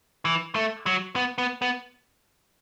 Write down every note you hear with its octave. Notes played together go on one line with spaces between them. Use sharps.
E3
A3
F#3
B3
B3
B3